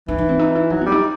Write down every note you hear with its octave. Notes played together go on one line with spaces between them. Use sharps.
E3 D#4
D#4
C4
D#4
E4
F#3 D#4
G3 B3
D#4